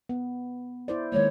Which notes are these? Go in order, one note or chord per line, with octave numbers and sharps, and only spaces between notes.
B3
E4 C5 D5
D#3 G#3 A#3 C#5